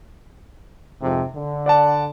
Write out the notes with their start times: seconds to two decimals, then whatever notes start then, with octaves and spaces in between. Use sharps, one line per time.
1.02 F2 G#2 C3
1.35 D3
1.66 D5 F#5 A5